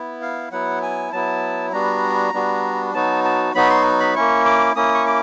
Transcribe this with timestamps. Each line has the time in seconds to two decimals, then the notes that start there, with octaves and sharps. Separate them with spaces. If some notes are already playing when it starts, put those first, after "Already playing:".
Already playing: B3 E4
0.22 F5
0.52 F#3 B3 E4 F#5
0.82 G#5
1.12 F#3 B3 E4 A5
1.73 G3 B3 D4 F#4 A#5
2.34 G3 B3 D4 F#4
2.94 F#3 B3 D#4 F#4 A5
3.24 A5
3.54 F#3 B3 D#4 F#4 B5
3.70 C6
4.00 B5
4.15 A#3 C#4 E4 C#6
4.45 D6
4.76 A#3 C#4 E4 D#6
4.94 C#6
5.06 D6